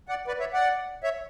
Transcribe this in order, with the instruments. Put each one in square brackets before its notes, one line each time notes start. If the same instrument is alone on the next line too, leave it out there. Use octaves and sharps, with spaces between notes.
[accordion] D5 F#5
B4 D5
C#5 E5
D5 F#5
C#5 E5